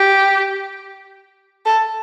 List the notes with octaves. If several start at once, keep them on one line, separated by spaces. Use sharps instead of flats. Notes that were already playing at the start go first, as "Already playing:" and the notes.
Already playing: G4
A4